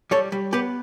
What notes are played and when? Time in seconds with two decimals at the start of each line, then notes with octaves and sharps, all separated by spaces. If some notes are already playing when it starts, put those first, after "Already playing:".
0.11 G3 A4 C#5
0.32 G3
0.53 B3 G4 B4